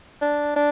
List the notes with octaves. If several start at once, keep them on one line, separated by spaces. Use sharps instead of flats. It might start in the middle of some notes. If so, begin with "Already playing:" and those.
D4
D4